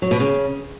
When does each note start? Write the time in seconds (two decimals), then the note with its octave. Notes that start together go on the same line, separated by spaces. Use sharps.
0.02 F#3
0.11 B2
0.20 C#3